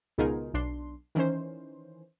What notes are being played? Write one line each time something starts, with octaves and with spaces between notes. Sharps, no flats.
C#2 B2 D#4 F4 G#4 A#4
B1 D4 C6
D#3 E3 C#4 C5